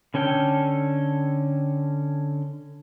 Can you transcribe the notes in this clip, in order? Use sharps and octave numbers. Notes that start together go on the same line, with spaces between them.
D3 C#4 A4 G5 F6